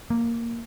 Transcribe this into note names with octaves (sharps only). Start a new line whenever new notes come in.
A#3